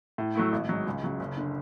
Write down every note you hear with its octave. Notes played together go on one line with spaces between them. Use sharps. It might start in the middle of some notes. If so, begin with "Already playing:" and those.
A2
F#3 A3 E4
G#1
G#2 F#3
C#2
C#3 F#3
F#1
D3